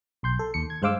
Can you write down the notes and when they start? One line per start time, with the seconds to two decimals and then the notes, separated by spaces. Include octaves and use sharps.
0.23 B1 C6 G6
0.39 A4
0.54 D#2 C#7
0.70 G#6
0.82 G2 G#3 C5 F5 D6 E6